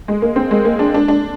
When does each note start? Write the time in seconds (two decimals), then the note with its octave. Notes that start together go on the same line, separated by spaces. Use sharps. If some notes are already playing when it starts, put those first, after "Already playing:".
0.08 G#3
0.22 A#3
0.36 C4
0.51 G#3
0.65 A#3
0.79 D4
0.94 D4
1.08 D4